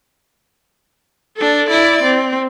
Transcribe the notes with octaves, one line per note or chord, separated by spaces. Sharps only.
D4 A4
E4 D5
C4